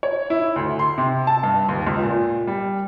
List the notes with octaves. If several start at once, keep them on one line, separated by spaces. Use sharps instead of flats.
C#5
E4
D2
C6
C3
A5
G2
D#2
C#2
A#2
G3